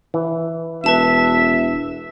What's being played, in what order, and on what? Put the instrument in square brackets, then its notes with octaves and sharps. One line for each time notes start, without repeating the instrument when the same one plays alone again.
[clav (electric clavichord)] E3
[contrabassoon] E1 [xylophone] B4 A5 E7 [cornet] E5